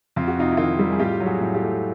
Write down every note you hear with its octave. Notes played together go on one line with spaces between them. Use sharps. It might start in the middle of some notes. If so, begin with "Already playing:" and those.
F2 F4
F#4
C3 D#4 F4
E4
D#3 D#4 F4
G3
G#4
A2 F4 G4
F#3
F#4 G#4
A2
F4 G4
A3